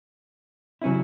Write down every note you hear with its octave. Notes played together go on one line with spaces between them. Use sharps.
C#3 F#3 C#4 E4